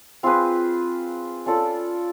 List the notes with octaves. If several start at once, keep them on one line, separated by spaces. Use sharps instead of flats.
C4 F4 G#4 B4
C#4 F4 A4 D5